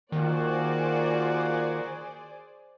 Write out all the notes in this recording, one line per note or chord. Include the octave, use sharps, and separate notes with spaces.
D#3 A#3 F4 F#4 G#4 C5 D5